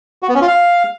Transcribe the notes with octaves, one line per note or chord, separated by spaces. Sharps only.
F#4
B3
C#4
F4
F5